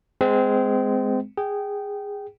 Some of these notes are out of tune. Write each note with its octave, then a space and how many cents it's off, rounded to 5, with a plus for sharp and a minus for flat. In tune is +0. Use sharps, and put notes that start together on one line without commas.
G#3 +0 C4 -25
G#4 -15 G5 -20